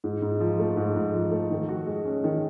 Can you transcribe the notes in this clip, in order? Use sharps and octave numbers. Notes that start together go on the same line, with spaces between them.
G#2
G#2
F3
A3
G#2
G#2
F3
A3
D#3
F#4
G#3
C#4
D#3